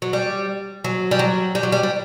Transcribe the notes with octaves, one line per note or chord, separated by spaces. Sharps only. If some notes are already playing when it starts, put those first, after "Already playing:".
F#3
G3
F#3
G3
F#3
G3
F#3
G3
G3